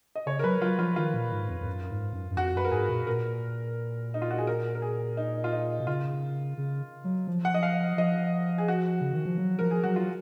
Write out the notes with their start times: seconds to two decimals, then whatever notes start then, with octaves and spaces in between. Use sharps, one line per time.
0.15 D#5
0.26 C#3 C#5
0.39 A#4
0.44 F#3 B4
0.61 F#3 F4
0.79 F3 F4
0.96 D#3 F4
1.14 A#2
1.32 G#2
1.49 F2
1.60 F2
1.67 F#2
1.90 G#2
2.13 F#2
2.31 F#2
2.37 F2 F#4
2.54 F#2 B4
2.64 A#4
2.71 G#2 G#4
2.89 A#2
3.07 A#2 A#4
4.14 D#4
4.22 F4
4.31 F#4
4.38 G#4
4.47 A#4
4.75 A#4
4.82 G#4
5.17 D#4
5.44 F4
5.52 D#4
5.80 B2
5.87 C#3 F4
6.58 C#3
7.04 F#3
7.27 F3
7.45 F#5
7.54 D#5
7.63 F5
7.97 F3 D#5
8.58 G#4
8.68 F#4
9.01 C#3
9.13 D#3
9.25 F3
9.38 F#3
9.59 F3 A#4
9.71 G#4
9.83 F#3 F#4
9.96 F4